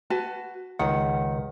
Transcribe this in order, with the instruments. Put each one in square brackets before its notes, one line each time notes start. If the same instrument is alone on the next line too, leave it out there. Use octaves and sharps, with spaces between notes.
[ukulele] F#4 B4 A5
[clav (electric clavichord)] C#2 D#3 [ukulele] F#5